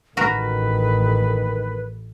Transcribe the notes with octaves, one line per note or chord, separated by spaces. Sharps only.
A1 D#3 F#4 A#4 B4